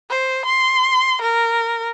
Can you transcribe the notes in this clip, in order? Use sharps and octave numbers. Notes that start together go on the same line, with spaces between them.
C5
C6
A#4